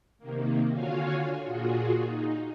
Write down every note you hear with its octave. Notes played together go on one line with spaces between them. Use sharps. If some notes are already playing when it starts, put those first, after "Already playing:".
C3 D#3 A#3
D3 F4 F#4 C#5 F5 G#5
A#2 F4 F#4 G#4
D#4